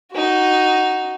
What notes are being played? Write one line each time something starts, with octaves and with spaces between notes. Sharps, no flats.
D#4 F#4